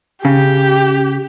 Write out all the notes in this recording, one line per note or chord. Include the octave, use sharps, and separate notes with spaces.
C#3 G4